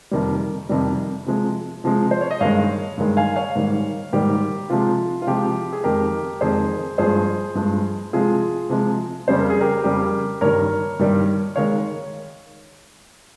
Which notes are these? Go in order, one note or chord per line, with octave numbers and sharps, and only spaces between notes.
F2 C3 D#3 G3
F2 C3 D#3 G3
C3 F3 G#3
C3 F3 G#3
C5
C#5
D#5
G2 D#3 G#3 C#5 F5
G2 D#3 G#3
F5 G#5
C#5 F5
G#2 D#3 G3
G#2 D#3 G3 G4
C3 F3 G#3 F4
F4
C3 F3 G#3 G4
G#4
F2 D#3 G#3 G4 A#4
F2 D#3 G#3 G#4 C5
G2 F3 G#3 G#4 C5
G2 F3 G#3
C3 F3 G#3 F4 G#4
C3 F3 G#3
F2 C#3 G3 C5
A#4
G#4
G4 A#4
F2 C#3 G3 G4 A#4
G2 D#3 G3 A#4 C#5
G2 D#3 G3
D#3 G#3 C#5 F5